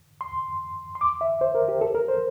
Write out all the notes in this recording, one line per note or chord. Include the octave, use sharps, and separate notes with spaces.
C6
C6
D6
E5
C5
A#4
G4
A4
A#4
C5